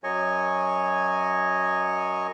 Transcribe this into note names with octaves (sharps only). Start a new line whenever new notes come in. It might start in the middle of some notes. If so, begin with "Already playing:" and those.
F#2 F#3 C#5 D#5 G#5 C#6